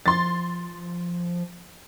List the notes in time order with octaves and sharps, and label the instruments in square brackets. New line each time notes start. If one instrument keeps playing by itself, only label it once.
[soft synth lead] F3 [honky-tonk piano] C6 A6